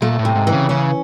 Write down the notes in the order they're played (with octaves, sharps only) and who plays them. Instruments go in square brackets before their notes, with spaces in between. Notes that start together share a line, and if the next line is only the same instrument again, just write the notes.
[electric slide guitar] A#2 [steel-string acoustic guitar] A3
[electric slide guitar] A2
[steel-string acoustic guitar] C3
[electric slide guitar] G#2
[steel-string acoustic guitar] E3
[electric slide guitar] C#3
[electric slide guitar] C#3 [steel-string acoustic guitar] C#4